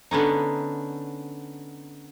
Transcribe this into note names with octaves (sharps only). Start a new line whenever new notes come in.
D3 B3 C#4 D#4